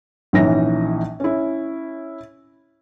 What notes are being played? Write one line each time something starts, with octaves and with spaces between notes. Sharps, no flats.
A#1 E3 C#4 D#4 E4 A#6
C#4 E4